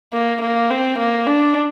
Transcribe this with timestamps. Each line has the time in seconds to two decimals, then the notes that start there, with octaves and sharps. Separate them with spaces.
0.13 A#3
0.41 A#3
0.70 C4
0.99 A#3
1.26 D4